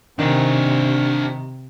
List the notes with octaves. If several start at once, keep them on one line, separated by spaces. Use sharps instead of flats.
C3 D#3 D4 C5